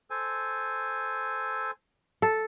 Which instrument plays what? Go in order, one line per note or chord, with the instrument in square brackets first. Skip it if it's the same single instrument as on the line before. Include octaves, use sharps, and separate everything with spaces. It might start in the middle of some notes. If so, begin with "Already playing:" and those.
[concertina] A4 C5 G#5
[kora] A4